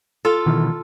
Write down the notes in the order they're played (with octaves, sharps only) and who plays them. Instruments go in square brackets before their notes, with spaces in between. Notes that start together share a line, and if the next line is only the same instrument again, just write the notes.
[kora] F4 A4
[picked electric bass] B2 D#3 E3